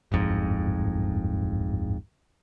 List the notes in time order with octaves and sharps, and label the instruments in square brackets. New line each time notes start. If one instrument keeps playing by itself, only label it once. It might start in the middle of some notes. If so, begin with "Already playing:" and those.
[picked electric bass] D1 G1 F2 G#2